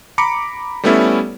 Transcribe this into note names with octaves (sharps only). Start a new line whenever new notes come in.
A#5 B5 D6 C#7
G3 A3 B3 C#4 E4 A4